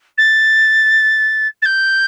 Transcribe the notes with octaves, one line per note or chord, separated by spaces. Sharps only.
A6
A6
G6